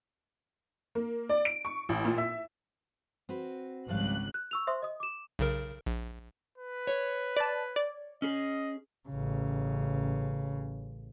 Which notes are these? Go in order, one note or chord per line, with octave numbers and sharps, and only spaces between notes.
A#3
D5
D7
C#6
A1
A#2
E5
C4 F#4 B4
G#1 C#2 F3 G3 F5 F#6
F#6
C#6 E6 F7
C5 E5 C6 D#6
D#5 D#6
D6 E7
B1 C#3 A#4
A#1
B4
C#5
D5 A5
D5
C#4 G#4 D#5
A1 C#3